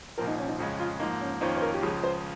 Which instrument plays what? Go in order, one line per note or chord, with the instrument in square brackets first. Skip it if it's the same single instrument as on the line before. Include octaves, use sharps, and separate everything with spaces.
[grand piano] C2 A#2 F3 C4 [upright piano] A#4
[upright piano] D#4
C#4
D#4
[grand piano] F2 C#3 G#3 [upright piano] F4
[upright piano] F4
[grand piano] G#2 F3 A#3 [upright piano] D#4
[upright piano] C#4
[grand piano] F2 D#3 A#3 C#4 F4 [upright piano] C5
[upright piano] C5
A#4
G4
[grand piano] C#2 C#3 F3 [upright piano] G#4
[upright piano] C5